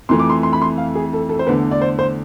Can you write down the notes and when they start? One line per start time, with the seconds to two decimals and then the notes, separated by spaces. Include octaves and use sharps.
0.09 F2 E3 A3 C6
0.19 D6
0.30 C6
0.43 C6
0.53 B5
0.62 C6
0.78 F5
0.95 G#4
1.13 A4
1.29 A4
1.39 C5
1.47 E2 D3 A3 B4
1.71 D5
1.82 C5
1.99 C5